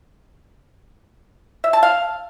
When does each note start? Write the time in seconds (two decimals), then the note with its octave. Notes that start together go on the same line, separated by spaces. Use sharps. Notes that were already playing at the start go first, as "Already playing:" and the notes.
1.64 E5
1.73 A5
1.83 F5